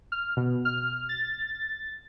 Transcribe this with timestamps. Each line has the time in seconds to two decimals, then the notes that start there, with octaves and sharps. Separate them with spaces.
0.12 F6
0.37 B2
0.65 F6
1.09 A6